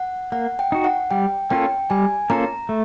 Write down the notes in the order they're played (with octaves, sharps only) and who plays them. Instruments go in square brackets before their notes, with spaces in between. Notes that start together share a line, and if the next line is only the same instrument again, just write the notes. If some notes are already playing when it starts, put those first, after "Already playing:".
Already playing: [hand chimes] F#5
[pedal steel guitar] A#3 [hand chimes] F#5
[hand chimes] G5
[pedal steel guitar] D#4 F#4
[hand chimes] F#5
[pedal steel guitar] G3 [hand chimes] G5
[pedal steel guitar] A#3 C#4 F4 A4 [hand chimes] G5
[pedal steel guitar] G3 [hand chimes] G#5
[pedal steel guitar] A#3 C#4 F4 A4 [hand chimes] A#5
[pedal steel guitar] A3